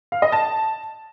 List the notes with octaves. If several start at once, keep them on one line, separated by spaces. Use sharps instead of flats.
F5
D#5
A5